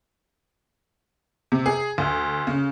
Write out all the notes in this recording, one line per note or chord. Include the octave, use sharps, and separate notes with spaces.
C3
G#4
D2
C#3